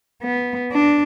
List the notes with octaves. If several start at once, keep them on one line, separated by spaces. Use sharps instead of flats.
B3
D4